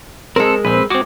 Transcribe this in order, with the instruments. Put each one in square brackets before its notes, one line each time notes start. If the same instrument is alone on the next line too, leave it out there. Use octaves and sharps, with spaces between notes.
[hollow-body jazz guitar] G#3 A#4 [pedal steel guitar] C4 A4
[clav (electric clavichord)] A#1 [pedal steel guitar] C4 B4
[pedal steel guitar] G#3 D6 [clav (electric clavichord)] C4 F#4